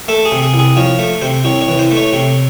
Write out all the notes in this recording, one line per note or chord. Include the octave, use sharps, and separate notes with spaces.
A3 A4
G#4
C3
G#4
C2
G#4
F3 C#5
A3
C3 C5
C2 C#5
C#5
E3
C5
A3
C#5
C3